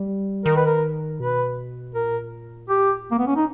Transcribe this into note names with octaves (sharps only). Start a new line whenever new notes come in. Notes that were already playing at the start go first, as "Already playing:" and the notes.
Already playing: G3
D#3 A#4
B4
A#4
B2 B4
A#2 A#4
G4
A#3
B3
C#4
D#4